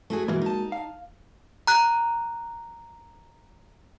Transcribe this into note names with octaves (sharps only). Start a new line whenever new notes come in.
A3 F#4 G#4
B2 E3 G#3 A#3 F#4
D#4 A5
F5
A#5 F#6